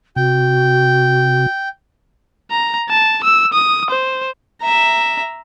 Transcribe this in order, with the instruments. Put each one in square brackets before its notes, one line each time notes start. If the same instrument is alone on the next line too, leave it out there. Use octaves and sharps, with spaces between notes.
[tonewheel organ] C3 [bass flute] F#4 [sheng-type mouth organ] G5
[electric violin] A#5
A5
E6
D#6
C5
[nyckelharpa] E5 A#5